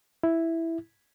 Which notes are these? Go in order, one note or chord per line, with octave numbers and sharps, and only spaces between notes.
E4